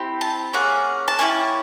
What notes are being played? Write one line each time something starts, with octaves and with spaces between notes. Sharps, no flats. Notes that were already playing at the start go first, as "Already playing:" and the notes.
Already playing: C4 E4 G4
A5
A#3 C#4 G#4 F#5
A5
A#3 C#4 E4 G4 G#5